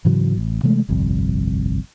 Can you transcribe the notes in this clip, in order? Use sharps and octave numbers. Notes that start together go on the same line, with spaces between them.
G#2 C#3 E3 F#3
A1
C3 E3 G#3 A3
G1 C2 F2